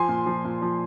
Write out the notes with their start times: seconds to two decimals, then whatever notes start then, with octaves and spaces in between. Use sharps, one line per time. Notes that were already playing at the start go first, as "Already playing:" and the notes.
Already playing: F3 G#5 C6
0.08 A#2
0.26 F3
0.44 A#2
0.62 F3